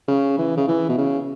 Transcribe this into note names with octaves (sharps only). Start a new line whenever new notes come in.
C#3
E3
C#3
E3
B2
C#3